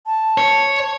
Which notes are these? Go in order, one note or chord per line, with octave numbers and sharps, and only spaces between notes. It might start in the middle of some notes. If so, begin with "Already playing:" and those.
A5
C#5